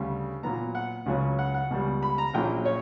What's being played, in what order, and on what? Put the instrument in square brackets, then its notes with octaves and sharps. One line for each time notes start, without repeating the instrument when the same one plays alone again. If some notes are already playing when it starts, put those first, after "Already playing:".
Already playing: [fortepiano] D2 C#3 G3
A#2 F#3 B3 A#5
F#5
C#2 C#3 F#3 C#4
F#5
F#5
C#2 B2 G3
B5
A#5
A#1 A#2 F#3 A#3 C#4 G5
C#5